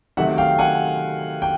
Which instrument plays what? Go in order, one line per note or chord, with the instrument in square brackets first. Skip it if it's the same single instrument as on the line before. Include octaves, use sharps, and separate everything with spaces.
[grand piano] C3 D#3 F#3 A3 E5 F#5
F5 G5
F#5 G#5
G5